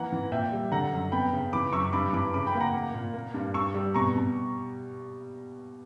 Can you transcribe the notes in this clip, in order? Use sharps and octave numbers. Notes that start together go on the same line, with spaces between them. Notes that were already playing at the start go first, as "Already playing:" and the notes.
Already playing: E3 A#3 F#5 A#5
E3
A#2 E5 G5
G3
D3 F#5 A#5
F#2
B3 G5 B5
C#3
E3 B5 D6
F#2 C#6 E6
G2 B5 D6
E3 B5 D6
C#3 B5 D6
G5 B5
A#3
F#5 A#5
A#3
A#2
A#3
G2
G2 C#6 E6
G3
B2 A#5 C#6
B2